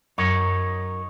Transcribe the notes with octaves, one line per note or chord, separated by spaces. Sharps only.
F#2 D#4 C#5